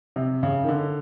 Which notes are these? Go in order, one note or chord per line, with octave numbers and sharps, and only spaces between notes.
C3
C#3
D#3
D3